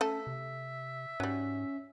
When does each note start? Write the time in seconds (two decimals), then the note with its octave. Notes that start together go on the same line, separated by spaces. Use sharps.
0.01 A3 C#4 A4 E5
0.27 C3
1.20 G#2 F#3 G3 C#4